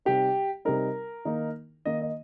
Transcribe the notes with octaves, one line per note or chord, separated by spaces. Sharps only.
C3 G3 D#4 G4
C3 G3 D#4 A#4
D#3 A#3 D#4
D#3 A#3 D#4 D#5
D#5